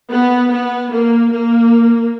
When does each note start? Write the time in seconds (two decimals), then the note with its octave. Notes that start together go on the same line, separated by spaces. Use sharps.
0.10 B3
0.50 B3
0.90 A#3
1.31 A#3